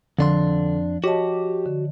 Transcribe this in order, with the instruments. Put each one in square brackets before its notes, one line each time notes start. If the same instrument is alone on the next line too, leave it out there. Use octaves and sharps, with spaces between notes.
[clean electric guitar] F2 D4 C6 [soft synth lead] D3 [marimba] F3
[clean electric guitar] F#4 [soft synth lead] G4 [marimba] C#5 D#5 A5
[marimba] D3